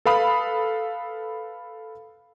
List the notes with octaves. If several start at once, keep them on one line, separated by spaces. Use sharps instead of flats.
A4 B4 F5 B5 D#6